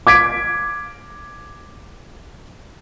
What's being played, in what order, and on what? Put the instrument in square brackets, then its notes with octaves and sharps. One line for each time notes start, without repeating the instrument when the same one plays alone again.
[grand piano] D6 G#6 B6 D7